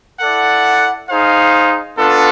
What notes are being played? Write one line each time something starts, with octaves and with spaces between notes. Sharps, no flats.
E4 A4 D5 F#5
D#4 G#4 C5 F5
B3 D4 F4 A4